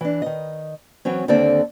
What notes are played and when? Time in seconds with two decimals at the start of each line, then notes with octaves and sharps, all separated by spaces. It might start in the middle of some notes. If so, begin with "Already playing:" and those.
0.01 E3 D4
0.22 D#3 D#5
1.05 E3 F#3 C4 C#4
1.28 D#2 D3 A#3 C4 A4 D5